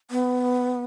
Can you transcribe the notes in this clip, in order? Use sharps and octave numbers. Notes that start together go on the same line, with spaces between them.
B3